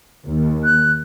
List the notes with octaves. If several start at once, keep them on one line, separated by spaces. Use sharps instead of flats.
D#2
F#6